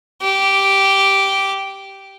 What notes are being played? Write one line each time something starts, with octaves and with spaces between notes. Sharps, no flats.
G4